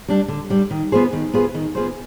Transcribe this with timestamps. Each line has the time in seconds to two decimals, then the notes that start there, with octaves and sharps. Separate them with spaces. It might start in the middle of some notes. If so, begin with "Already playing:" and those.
0.08 G3 D4
0.28 D3
0.50 G3 D4
0.71 D#3
0.92 B3 F4 G#4 C5
1.13 D#3
1.34 B3 F4 G#4 C5
1.55 D#3
1.75 B3 F4 G#4 C5